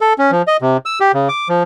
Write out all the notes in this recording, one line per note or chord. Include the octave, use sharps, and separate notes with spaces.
A4
C#4
F3
D#5
C3
E6
G4
C#3
D6
F3